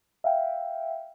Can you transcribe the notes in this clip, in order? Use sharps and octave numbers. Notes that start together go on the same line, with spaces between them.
E5 F5 G5